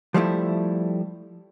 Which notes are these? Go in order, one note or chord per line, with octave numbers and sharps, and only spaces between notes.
F3 G3 A3 E4